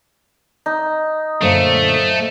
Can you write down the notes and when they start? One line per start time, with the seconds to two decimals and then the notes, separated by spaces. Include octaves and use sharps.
0.66 D#4
1.41 F#2 A#2 D3 A3 A4 C5 F5